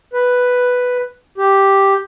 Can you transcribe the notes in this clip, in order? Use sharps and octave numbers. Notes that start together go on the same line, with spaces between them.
B4
G4